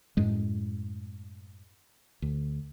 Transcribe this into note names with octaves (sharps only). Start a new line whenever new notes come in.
F#2 A2 G#3
D2